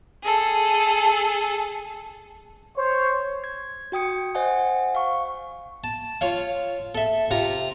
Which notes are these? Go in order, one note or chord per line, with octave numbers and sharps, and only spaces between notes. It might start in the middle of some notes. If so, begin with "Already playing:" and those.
G#4 A4
C5 C#5
G#6
F#4 G5 D#6 C#7
C5 D#5 F#5 G#5
F5 C#6
A5
F4 C#5 F5
A4 E5
C3 F4 A#5